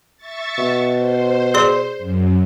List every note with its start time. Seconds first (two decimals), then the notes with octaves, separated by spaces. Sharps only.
0.17 E5 C#6 A6
0.58 B2
0.94 C5
1.54 G#4 D5 C6
1.98 F#2